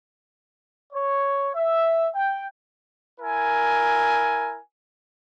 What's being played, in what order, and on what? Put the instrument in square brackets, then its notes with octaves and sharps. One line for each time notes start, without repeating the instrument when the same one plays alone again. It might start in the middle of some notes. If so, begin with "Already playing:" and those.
[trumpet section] C#5
E5
G5
E4 A#4 G#5